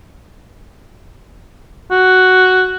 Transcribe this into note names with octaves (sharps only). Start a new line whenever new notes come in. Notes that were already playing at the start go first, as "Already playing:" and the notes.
F#4